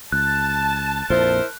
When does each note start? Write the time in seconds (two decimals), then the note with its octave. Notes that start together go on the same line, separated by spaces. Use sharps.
0.12 C#2 A5 F#6
1.10 A#1 F2 A#2 E4 A#4 C5